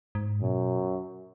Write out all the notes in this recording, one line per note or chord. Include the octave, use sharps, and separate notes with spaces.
G#2
F#2 B2